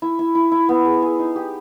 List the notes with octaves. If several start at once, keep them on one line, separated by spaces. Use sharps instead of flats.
E4
E4
E4
E4
B3
G#4
G#4
D#4
G4